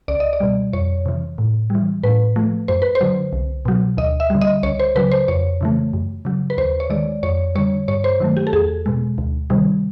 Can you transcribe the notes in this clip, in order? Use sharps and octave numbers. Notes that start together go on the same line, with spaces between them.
C#2 D5
D#5
D5
B2 G3
F2 C#5
C3 E3
A2
E3 G3
A2 B4
F3 A3
F#2 C5
B4
C5
D3 F#3
C2
B2 F#3
D2 D#5
E5
D3 G3
D#5
C#2 C#5
C5
C#3 F#3 B4
C5
F2 C#5
C#3 E3 A3
F#2
C#3 F#3
B4
D#2 C5
C#5
D#3 G#3 D5
F2 C#5
D3 G3 C#5
G2 C#5
C5
D#3 F#3 A3
G4
A4
E2 G#4
B2 G#3
D2
C3 D#3 G3